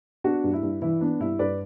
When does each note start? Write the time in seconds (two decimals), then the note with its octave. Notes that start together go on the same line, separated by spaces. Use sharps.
0.24 B3 D4 F#4
0.44 G2
0.53 E4
0.63 G2
0.82 E3 E4
1.01 B3 D4
1.20 G2 E4
1.39 G2 B4 D5